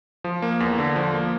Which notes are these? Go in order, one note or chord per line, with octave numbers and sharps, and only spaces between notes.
F3
A#3
E2
D3
F3
A#3